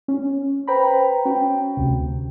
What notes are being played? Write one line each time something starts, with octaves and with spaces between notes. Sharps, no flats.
C#4
B4 C5 G5 A#5 B5
C#4 F#4 G5
D2 C3